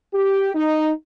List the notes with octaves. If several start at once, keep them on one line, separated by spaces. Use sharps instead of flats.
G4
D#4